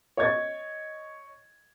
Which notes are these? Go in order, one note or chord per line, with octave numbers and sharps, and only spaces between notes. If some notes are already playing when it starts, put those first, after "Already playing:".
C#5 D#5 C#6 G#6 A6